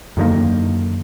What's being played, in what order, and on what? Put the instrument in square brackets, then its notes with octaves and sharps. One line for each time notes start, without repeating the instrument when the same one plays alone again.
[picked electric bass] F#2 D3 D#3 A#3